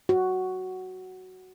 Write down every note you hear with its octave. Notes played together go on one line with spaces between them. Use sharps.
F#4